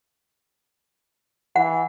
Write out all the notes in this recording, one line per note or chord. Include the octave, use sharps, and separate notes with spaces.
E3 F#5